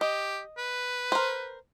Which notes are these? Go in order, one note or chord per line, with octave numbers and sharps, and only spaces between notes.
G4 D#5
B4
A#4 C5